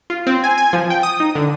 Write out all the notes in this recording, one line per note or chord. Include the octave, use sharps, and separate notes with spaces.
F4
C4
G#5
G#5
F3
G5
D#6
D#4
D3